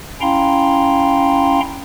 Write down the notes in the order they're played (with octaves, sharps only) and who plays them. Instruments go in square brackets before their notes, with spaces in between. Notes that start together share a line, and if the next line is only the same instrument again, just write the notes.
[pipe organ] C#4 E4 F5 G5 A#5 C6